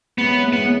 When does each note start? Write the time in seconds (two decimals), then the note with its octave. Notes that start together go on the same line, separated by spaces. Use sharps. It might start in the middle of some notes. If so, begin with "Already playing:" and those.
0.18 F#2 E3 G#3 B3
0.53 F#2 E3 G#3 B3